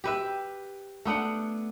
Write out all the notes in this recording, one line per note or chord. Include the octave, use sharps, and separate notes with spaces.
G4 B4 E5
A3 B3 D4 F#5